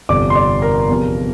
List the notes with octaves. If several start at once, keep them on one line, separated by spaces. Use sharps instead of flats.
G1 F2 C3 D5 D6
C6
D5 D6
A#4 A#5
E2 C3 F3